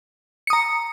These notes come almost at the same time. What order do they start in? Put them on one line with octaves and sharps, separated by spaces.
C#7 D#6 A#5